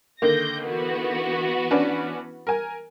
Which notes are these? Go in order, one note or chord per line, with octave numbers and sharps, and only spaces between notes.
D3 D#3 A#3 G6 A#6
E3 B3 F#4
C#4 D4 B4
A#4 G#5